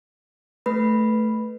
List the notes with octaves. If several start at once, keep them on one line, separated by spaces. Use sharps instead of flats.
A3 B4 B5